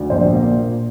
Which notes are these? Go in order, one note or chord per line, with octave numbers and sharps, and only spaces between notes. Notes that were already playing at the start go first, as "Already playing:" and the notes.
Already playing: D2
A#1 C5
A#3
A#2